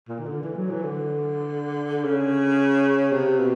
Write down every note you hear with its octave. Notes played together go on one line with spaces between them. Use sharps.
A#2
D#3
D3
E3
F#3
E3
D3
C#3
C3
B2